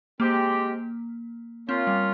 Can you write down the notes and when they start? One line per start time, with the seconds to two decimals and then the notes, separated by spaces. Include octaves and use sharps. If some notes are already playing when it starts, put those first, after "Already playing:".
0.19 G#3 A#3 C4 G4
1.68 A#3 C4 C#4 F4
1.87 G3